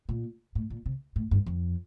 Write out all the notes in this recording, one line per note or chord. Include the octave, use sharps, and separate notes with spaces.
A#2
A2
A#2
C3
A2
G2
F2